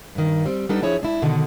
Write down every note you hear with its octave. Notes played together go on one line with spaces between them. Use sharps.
G2 D#3
G3 C4
G3 B3 D4 D#4 A4
F3 D4 E4 G#4 C#5
G#3 D4 E4
B2 D3 D#3